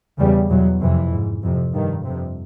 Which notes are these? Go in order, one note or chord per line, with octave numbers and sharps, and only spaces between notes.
E2 C#3 G3
E2 B2 F#3
F2 C3 E3
G#2
F2 C3
G2 D#3
F2 C3